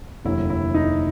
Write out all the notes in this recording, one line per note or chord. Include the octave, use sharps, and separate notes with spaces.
F1 D#2 D3 F#3 E4
E4
D#4